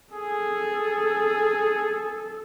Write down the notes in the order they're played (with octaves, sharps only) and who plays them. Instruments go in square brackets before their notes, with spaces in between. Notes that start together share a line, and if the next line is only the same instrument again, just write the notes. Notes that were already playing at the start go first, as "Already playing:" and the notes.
[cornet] G#4 [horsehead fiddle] A4